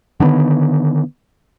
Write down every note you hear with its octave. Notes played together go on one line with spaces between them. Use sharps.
D3 D#3 A3 B3